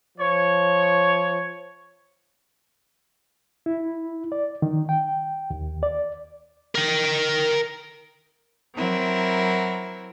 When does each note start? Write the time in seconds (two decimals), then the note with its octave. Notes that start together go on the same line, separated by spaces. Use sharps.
0.18 F3 C#5
3.66 E4
4.32 D5
4.62 D#3
4.89 G5
5.50 D#2
5.83 D5
6.75 A#4 G5
8.75 F#3 C4 E4 A#4